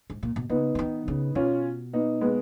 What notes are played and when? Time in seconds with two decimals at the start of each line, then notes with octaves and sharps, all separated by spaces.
0.10 G#2
0.23 A#2
0.36 B2
0.49 C#3 B3 D#4
0.75 C#3
0.79 D#3
1.08 C#3
1.35 B2 C#4 F4
1.93 B3 D#4
2.21 G#3 B3